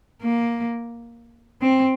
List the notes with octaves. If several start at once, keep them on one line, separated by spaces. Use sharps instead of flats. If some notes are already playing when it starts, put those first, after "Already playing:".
A#3
C4